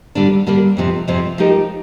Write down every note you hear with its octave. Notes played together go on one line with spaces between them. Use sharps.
D3 G3 A#3 D4
D3 G3 A#3 D4
F2 C3 F3 C4
F2 C3 F3 C4
F3 A3 D#4 G4 A#4